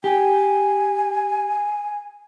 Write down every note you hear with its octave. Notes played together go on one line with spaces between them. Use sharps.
G4 G#5